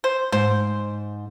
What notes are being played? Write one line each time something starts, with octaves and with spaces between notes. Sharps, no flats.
C5
G#2 C5